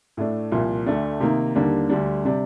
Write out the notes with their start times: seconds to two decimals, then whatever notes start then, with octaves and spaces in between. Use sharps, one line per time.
0.17 A2 A3 D4
0.52 C2 A#2 F3
0.86 D2 D3 A3 D4
1.20 C3 D#3 A#3 D#4
1.55 D#2 D3 G3 A#3 D4
1.89 D2 D3 G3 D4
2.25 C3 G3 D4